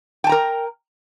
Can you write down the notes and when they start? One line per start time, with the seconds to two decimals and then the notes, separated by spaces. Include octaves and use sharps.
0.24 G5
0.27 A5
0.29 A#5
0.32 A#4